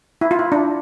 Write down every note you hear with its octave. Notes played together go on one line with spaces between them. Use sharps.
E4
F4
E4
D4